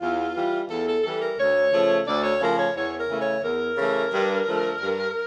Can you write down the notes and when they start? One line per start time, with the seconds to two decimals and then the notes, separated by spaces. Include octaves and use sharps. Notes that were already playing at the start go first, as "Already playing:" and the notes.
0.01 E2 F4
0.36 E3 G3
0.70 E2 A4
0.87 A4
1.04 E3 G3 A4
1.21 A#4
1.39 D2 C#5
1.72 C#3 F3 A3
2.07 D2 D5
2.23 C#5
2.41 C#3 F3 A3 A#4
2.58 C#5
2.75 E2 C#5
2.98 A#4
3.09 C#3 E3 A3
3.20 C#5
3.43 E2 A#4
3.78 C#3 E3 A3
4.12 G2
4.46 D3 F3 A3
4.80 G2